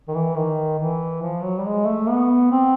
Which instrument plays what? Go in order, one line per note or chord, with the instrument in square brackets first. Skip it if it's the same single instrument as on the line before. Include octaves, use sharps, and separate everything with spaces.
[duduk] D#3
E3
D#3
E3
F3
F#3
G3
G#3
A3
B3
C4